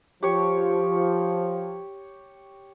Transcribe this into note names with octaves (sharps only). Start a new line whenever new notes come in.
F3 G4 C#5